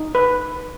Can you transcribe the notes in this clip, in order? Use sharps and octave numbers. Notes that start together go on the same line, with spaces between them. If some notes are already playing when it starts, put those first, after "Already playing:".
Already playing: D#4
B4